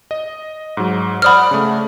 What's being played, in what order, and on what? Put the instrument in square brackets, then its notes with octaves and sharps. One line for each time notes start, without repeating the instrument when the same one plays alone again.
[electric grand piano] D#5
G#2 F#3
[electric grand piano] C5 D5 F#5 [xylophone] B5 D#6 F6
[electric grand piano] C#3 A3